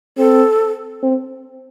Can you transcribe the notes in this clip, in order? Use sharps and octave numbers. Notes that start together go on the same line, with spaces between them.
C4 A4
C4